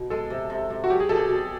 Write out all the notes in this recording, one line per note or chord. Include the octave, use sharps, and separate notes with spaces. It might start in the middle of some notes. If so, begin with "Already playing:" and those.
Already playing: B2
G#3 A4
C3
C3
C3
F#4
F#3 G4
G#4
B2 A4
A4
B2